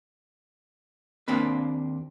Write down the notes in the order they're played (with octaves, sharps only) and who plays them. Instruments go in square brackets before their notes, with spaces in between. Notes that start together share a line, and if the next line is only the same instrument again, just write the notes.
[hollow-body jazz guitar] D#2 A#3 C4 D4 B4